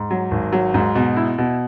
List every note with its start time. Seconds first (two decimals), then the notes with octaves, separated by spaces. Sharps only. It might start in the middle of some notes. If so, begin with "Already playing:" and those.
Already playing: G#2
0.10 F#3
0.31 G#1
0.52 F#3
0.74 G#2
0.95 B2
1.16 E4
1.38 B2